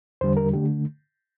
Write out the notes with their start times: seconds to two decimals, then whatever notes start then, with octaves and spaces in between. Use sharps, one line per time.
0.21 E2 D3 G3 C5
0.37 A#4
0.53 D3 A3 G4